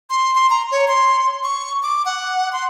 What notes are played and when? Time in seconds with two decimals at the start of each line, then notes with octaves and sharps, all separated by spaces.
0.10 C6
0.35 C6
0.50 A#5
0.71 C#5
0.88 C6
1.44 C#6
1.83 D6
2.06 F#5
2.52 C6